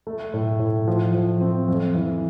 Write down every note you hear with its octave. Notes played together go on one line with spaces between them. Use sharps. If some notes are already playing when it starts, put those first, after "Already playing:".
A3
A2
A2
F3
F3
C4
F2
E3